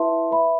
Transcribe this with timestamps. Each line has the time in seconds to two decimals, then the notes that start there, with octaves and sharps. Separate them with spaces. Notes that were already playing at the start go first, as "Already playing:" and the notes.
Already playing: E4 B4 E5 A5 C6
0.31 B4 E5 B5